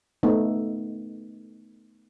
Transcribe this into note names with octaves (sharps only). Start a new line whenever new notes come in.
A3 B3 D#4